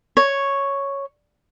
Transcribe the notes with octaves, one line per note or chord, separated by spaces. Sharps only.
C#5